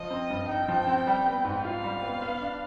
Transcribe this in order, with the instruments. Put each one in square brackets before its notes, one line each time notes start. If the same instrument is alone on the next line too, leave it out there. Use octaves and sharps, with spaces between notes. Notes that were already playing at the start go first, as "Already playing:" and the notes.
Already playing: [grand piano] F3 [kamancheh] D#5
[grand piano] C4
G2
[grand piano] D#4 [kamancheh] G5
[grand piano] F3
C4
G3
B3
G#2
[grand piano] F4 [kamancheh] F5
[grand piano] G3
B3
B3
D4